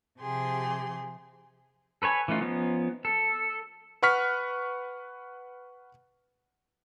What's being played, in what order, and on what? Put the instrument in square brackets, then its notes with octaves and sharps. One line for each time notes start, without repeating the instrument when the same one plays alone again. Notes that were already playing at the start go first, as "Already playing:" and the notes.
[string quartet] C3 F3 G4 G#4 C6
[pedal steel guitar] A4 B4 C#5 G#5 B5
E3 A3 C#4 D#4 F4
F3 B3 C#4 D#4
A4
[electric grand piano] B4 F#5 C#6 F6 B6